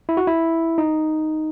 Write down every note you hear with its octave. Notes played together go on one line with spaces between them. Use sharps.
E4
F#4
E4
D#4